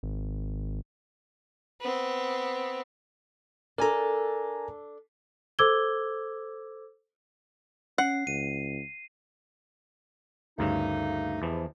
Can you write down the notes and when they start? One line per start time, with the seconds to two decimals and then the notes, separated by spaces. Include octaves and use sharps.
0.03 G#1
1.81 B3 C4
3.78 D4 A4 A#4 G#5 A#5
5.59 A4 C5 D6 E6 G#6 G7
7.98 C#4 F#5 C7
8.27 C#2 D#7
10.58 D2 G2 C#3 A3 A#3 D#4
11.42 E2 G#2 C3 E3 F3